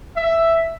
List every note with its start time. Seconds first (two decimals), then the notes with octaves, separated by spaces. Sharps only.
0.15 E5